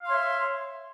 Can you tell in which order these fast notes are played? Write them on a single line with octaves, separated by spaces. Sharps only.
F5 C6 C#5 E5